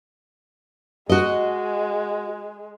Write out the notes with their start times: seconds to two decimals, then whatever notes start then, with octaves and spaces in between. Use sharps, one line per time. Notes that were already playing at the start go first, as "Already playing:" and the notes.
1.09 G#3 F#4 D#5